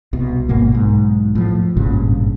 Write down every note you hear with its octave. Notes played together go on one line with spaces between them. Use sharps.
C2 B2
G#1 G#2 B2 A#3
B1 G#2
A2 F3
G#1 G2 A#2 C#3